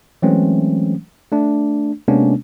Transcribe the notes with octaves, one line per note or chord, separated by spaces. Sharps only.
E3 F#3 G#3 A3 C4 C#4
A3 D4
C3 G#3 A#3 B3 C#4 D4